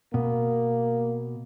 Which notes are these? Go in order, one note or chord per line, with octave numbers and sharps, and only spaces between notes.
B2 A#3